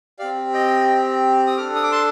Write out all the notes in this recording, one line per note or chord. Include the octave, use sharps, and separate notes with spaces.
C4 G4 D5 F5
D#5 G5
D#6
D4 A4 D6 F6
D#6
D6
A5 C6